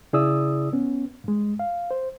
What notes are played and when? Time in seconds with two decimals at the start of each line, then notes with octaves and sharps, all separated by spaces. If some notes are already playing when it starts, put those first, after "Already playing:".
0.13 C#3 E4 G#4 D5 D#6 E6
0.73 B3 C#4
1.24 G2 G#3
1.59 F5
1.91 C5